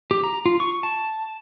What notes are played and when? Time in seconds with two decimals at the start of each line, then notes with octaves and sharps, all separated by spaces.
0.11 G4
0.24 A#5
0.46 F4
0.60 C#6
0.83 A5